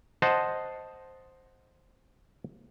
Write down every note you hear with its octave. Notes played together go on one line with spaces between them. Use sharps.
C5 D#5 F#5 A5